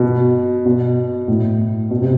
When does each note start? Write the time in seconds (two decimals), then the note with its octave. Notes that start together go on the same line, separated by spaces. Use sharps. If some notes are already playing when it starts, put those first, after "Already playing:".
Already playing: B2
0.65 B2
1.28 A2
1.90 B2
2.02 C3